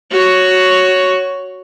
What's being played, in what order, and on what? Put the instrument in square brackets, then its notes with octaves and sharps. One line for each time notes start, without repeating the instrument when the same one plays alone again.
[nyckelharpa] F#4 C#5